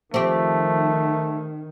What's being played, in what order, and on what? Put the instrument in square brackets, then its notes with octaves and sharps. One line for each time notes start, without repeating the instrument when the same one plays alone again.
[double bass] D#3 [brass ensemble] F3 [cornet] A3 [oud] C4 G4